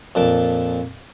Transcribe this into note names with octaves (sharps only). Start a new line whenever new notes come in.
F2 A#2 A5 D6